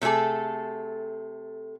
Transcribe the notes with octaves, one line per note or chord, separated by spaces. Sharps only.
C3 A3 C#4 G#4 A4